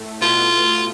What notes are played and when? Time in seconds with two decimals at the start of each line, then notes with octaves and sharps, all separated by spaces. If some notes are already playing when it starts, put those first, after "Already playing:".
Already playing: A2 A3
0.21 B2 B3 F4